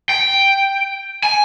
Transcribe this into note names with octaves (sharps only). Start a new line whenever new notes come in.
G5
G#5